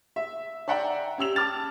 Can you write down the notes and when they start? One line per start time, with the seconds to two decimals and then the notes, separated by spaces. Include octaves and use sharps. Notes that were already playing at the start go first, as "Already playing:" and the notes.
0.16 E5
0.68 D5 E5 F#5 G5 A#5
1.18 C#4 G4 E6 F7
1.36 A5 D6 F6 A6